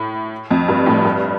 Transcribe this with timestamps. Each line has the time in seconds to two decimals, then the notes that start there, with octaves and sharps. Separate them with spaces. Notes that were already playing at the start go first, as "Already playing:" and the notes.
Already playing: A2
0.51 F2
0.68 G2
0.86 A2
1.04 G2